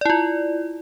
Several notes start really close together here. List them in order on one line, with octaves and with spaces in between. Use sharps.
D5 E4 F4